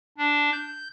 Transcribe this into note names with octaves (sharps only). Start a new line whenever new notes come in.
D4
G6